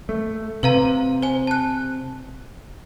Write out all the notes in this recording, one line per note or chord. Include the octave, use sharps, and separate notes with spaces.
A3
C3 B4 F5 A#5
C5 G#5
A5 F#6